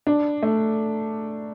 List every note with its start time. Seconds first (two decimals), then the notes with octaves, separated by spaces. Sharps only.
0.07 D4
0.43 A3